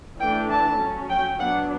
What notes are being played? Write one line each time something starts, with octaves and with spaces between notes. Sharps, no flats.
E3 A3 D4 G5
A5
F#3 C#4
G5
F#3 B3 D4 F#5